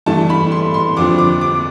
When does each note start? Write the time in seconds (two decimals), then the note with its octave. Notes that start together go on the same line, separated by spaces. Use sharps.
0.06 G2 E3 A3 A5
0.30 B5
0.52 C6
0.74 C6
0.96 F2 D3 F3 D6
1.18 D6
1.41 D6